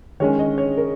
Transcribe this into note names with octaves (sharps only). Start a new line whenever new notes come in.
D#3 G#3 C#4 C#5
D#5
C#5
A#4